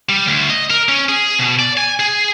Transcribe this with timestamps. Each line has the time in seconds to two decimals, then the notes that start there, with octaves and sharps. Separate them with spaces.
0.09 G3
0.28 D2
0.50 D#5
0.70 A#4
0.89 C#4
1.09 G#4
1.39 B2
1.59 D5
1.77 G#5
2.00 G#4